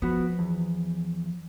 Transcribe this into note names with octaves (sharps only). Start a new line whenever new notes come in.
F3 B3 F#4 B4
E2